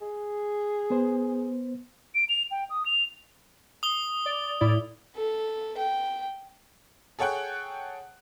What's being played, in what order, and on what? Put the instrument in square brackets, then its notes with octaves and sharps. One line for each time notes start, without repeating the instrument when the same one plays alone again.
[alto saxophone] G#4
[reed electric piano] B3 C5
[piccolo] D7
F7
G5
D#6
F7
[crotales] D#6 G7
[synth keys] D5
A2 E4 D5
[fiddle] A4
G5
[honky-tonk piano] G#4 A4 C#5 F#5 G5 F#6